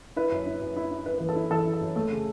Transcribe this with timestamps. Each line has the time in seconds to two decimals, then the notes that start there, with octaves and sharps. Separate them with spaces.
0.16 E4 B4
0.32 F#2
0.46 E4
0.61 F#2
0.77 E4
0.91 E4
1.06 E4 B4
1.18 E3 B4
1.29 A4
1.36 E4
1.51 E3 A4
1.66 E4
1.74 A4
1.81 F#2
1.96 A3 A4
2.11 C#3